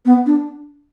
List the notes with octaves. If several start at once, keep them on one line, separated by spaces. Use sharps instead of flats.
B3
D4